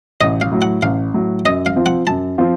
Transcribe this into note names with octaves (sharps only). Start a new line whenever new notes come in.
A1 D#5
F5
A2 F#3
F#5
A1 F5
A2 F#3
F#2 D#5
F5
F3 C4 F4
F#5
F#2 A5
F3 C4 F4